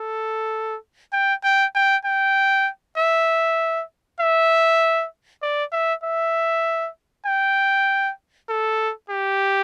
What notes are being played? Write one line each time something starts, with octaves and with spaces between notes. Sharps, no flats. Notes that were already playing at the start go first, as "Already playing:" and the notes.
Already playing: A4
G5
G5
G5
G5
E5
E5
D5
E5
E5
G5
A4
G4